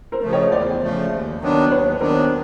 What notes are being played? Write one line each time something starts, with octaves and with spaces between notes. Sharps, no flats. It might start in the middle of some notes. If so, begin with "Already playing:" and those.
A#4 C5
C#3 F3 A3
C#5 D#5
E2 C5 D5
C#3 F3 A3
D#2
D#3 F#3 B3 D4
D#2 B4 C#5
D#3 F#3 B3 D4 A#4 C5